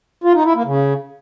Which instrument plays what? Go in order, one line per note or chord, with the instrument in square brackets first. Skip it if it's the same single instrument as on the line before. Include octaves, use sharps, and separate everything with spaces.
[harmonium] F4
D#4
E4
A#3
C#3